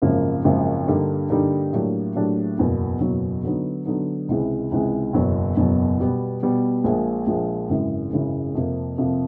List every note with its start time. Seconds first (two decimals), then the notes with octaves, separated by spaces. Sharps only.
0.02 G#1 F#2 C#3 F3 A#3
0.44 G#1 F#2 C#3 F3 A#3
0.87 G2 D3 G3 A#3 D#4
1.30 G2 D3 G3 A#3 D#4
1.73 A2 F#3 A#3 D4 G4
2.15 A2 F#3 A#3 D4 G4
2.58 F#1 E2 B2 F#3 A#3
3.01 F#1 E2 B2 F#3 A#3
3.44 D3 F#3 B3 D#4
3.86 D3 F#3 B3 D#4
4.29 C#2 C3 E3 G#3
4.71 C#2 C3 E3 G#3
5.13 F#1 E2 B2 F#3
5.57 F#1 E2 B2 F#3
6.00 B2 G3 B3
6.43 B2 G3 B3
6.84 A#1 A#2 F3 G#3
7.27 A#1 A#2 F3 G#3
7.69 G#1 F#2 C#3 E3 G#3
8.12 G#1 F#2 C#3 E3 G#3
8.55 F2 C3 F3 A#3
8.98 F2 C3 F3 A#3